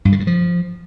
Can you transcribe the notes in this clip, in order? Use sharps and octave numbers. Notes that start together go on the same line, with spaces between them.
G2
D3
G2
F3